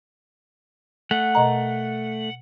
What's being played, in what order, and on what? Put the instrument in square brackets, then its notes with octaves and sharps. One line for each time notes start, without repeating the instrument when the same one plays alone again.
[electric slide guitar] A3 [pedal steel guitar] F#5
[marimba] B2 D#5 A#5